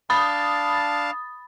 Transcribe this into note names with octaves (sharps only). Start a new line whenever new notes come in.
D4 F5 A5 B5 D#6 A6